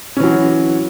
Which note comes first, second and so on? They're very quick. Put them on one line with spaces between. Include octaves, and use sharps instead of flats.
C#4 E3 F#3